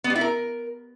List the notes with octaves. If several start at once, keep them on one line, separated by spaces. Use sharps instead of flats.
B3
G3
E4
A#4